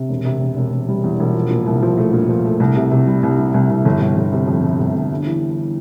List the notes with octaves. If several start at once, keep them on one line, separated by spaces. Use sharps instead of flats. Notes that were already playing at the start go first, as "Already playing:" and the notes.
Already playing: C3
E1
C3
E1
E1
E1
G3
E2
E1
F3
A#2
C2
F3
A3
A#2
F3
A3
C2
C3
C3
G3
C2
G3
C2
C2
G1
G1
G1
C3
F2
G1
G1
G1
G2
E3